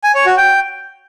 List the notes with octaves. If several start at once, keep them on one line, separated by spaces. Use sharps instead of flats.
G#5
C#5
F#4
G5